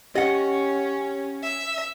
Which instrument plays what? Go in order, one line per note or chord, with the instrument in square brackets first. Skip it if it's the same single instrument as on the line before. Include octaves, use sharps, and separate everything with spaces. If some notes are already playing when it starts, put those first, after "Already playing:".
[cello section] C#4 [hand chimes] G4 [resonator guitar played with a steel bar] D#5 F#5
[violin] E5